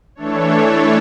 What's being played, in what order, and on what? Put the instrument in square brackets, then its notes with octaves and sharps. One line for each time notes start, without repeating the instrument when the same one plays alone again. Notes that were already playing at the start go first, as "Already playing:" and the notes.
[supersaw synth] E3 A3 D4 A4 C#5